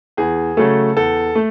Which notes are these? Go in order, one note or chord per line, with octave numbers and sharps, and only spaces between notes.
E2 G#4
C#3 F#3 A3 A4
E2 A4
A3